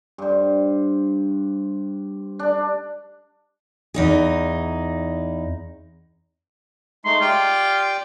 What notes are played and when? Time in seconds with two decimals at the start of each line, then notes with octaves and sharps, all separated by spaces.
0.18 G2 C5
2.39 D4
3.94 E2 D#4 G#4
7.05 G#3 A3 D#4 C6
7.21 F4 G4 D5 G5